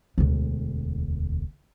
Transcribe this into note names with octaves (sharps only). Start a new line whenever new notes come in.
E1 D2